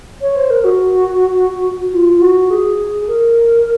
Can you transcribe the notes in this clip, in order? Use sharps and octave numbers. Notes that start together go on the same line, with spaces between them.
C#5
C5
A#4
F#4
F4
F4
F#4
G#4
A#4